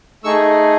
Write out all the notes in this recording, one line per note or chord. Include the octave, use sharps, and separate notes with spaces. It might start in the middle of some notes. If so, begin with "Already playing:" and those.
A3 D#4 G#4 C#6 E6